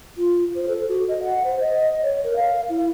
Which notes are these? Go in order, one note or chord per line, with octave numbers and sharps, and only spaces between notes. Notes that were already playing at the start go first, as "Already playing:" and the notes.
F4
C5
A4
F#4
D#5
F#5
C5
D#5
C#5
A#4
F5
E4